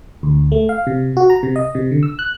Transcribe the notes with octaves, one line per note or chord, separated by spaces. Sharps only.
D2
A3
F5
C3
F#4
A#5
C3
D#5
C3
D3
E6
F#6